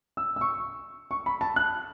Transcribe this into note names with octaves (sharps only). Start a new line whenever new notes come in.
E6
E6
C#6
C#6
B5
A5
F#6